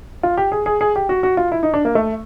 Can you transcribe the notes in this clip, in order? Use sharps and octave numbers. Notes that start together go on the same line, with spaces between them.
F4
G4
G#4
G#4
G#4
G4
F#4
F#4
F4
E4
D#4
D4
A#3
A3